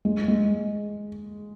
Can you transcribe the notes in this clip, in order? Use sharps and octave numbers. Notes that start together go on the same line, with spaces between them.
G#3
G#3